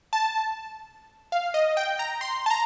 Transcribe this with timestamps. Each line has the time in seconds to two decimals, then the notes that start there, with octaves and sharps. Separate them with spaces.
0.13 A5
1.32 F5
1.54 D#5
1.77 G5
1.99 A#5
2.21 C6
2.46 A5
2.51 A#5